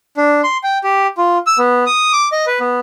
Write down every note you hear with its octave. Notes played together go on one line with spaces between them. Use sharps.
D4
C6
G5
G4
F4
E6
B3
D#6
D6
D#5
B4
B3